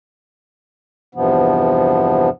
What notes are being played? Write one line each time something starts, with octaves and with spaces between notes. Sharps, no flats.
E2 G2 C3 F3 B3